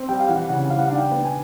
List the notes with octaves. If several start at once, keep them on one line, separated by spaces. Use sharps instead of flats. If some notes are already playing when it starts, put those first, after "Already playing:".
Already playing: C4
G3 G5
F5
E3 F#5
C#3 F#5
G3 F5
F#5
D4 F5
G5
B3
G#5